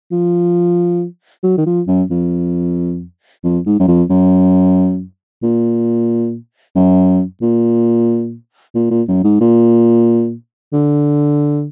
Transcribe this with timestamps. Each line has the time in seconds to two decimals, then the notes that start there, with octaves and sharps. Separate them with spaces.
0.12 F3
1.43 F#3
1.58 D#3
1.66 F3
1.88 F#2
2.10 F2
3.44 F2
3.66 G#2
3.79 F#2
3.88 F2
4.10 F#2
5.43 A#2
6.75 F#2
7.42 A#2
8.75 A#2
8.91 A#2
9.08 F#2
9.24 G#2
9.40 A#2
10.73 D3